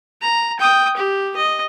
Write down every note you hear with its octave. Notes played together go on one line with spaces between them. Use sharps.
A#5
G5 D#6
G4
D#5